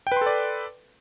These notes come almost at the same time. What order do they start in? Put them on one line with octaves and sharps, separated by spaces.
G5 B4 C6 A4 D5